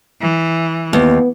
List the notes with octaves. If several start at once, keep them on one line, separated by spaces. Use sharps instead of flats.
E3
D#2 B3